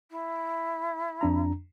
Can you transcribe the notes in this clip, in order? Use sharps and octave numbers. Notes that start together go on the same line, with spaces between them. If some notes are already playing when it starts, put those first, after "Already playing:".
E4
F2 D4 A#5